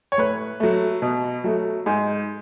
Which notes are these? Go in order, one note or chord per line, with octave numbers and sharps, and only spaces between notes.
C#5
A2 B4
F#3 A3
B2
F#3 A3
G#2